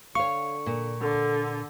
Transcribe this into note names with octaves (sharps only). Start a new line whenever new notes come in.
D3 C#5 F5 C#6
A#2
D3 A4